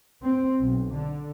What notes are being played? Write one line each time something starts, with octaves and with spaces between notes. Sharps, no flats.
C4
B1
D3